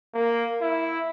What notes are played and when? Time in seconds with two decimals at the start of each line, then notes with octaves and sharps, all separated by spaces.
0.14 A#3
0.61 E4